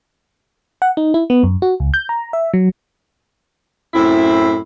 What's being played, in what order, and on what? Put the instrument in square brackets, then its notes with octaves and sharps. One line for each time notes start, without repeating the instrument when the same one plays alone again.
[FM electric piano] F#5
D#4
E4
B3
F#2
F#4
C#2
G6
A#5
E5
F#3
[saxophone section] F#2 A2 C4 E4